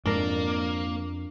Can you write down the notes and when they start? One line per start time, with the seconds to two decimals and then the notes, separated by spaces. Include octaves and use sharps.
0.06 F2 G#2 A#3 D4 A#4